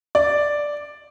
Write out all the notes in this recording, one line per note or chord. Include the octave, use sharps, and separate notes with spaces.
D5